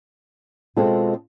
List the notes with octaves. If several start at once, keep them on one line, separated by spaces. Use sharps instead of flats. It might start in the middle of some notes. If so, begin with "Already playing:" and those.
B2 G#3 C4 F4 A4